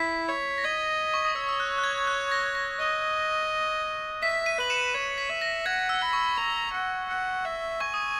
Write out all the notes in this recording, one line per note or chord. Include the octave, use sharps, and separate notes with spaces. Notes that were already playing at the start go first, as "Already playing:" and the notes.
Already playing: E4 B6
C#5
A#6
D#5 G#6
C#6
D#6
C#5 E6
E6
F#6
F#6
G#6
F#6
A#6
A#6
D#5
E5 B6
B6 D#7
B4 F#7
C#7 E7
C#5
B6
E5
A#6
F#5 G#6
E6
B5
C#6
A#5
F#5
F#5
E5
G#5 C#6
D#6